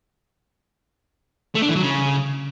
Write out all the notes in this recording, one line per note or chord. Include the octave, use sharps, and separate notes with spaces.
A3
D4
E3
F#3
C#3